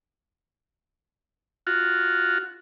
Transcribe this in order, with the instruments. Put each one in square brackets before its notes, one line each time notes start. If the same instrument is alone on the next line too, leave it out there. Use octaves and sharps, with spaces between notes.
[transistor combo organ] F4 F#4